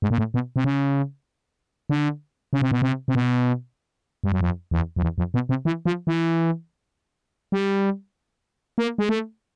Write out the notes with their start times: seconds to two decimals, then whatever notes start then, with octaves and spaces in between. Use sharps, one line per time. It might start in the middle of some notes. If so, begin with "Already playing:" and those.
0.02 G#2
0.11 A#2
0.18 A2
0.34 B2
0.56 C3
0.64 C#3
1.90 D3
2.53 C#3
2.62 C3
2.71 B2
2.82 C3
3.08 C3
3.15 B2
4.24 G2
4.32 F#2
4.41 F2
4.71 E2
4.96 F2
5.02 E2
5.18 F2
5.34 B2
5.49 C3
5.65 E3
5.86 F3
6.07 E3
7.52 G3
8.78 A#3
8.98 G#3
9.09 A3